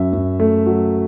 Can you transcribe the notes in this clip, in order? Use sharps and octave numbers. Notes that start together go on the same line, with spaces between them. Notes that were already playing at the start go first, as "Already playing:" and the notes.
Already playing: F#2 F#3 E5
F#2
A3
F#3